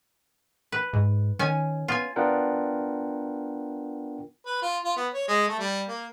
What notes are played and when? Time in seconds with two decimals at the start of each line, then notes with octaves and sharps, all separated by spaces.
0.72 B4
0.93 G#2
1.39 D#3 C#4 G#5
1.88 B3 F4 G#5
2.16 B3 D4 F4 A#4 F#5 G5
4.46 B4
4.62 F4
4.84 F4
4.96 B3
5.13 C#5
5.28 G#3
5.48 A3
5.59 G3
5.88 A#3